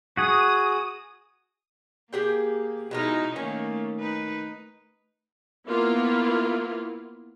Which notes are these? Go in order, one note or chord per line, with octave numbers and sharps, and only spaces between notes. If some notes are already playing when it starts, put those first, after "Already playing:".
F#4 G#4 D#6
A#3 G4 G#4 G5
B2 G#3 D#4 E4 A#4
D#3 A3 A#3 C#4 G#5
D#4 B4
A#3 B3 E4 F4